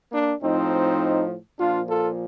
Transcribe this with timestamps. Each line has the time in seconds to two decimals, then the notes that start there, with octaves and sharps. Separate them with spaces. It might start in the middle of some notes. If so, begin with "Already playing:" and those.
0.12 A#3 D4
0.42 A2 F3 C4 D#4
1.59 A#2 F3 D4 F4
1.88 F4 A4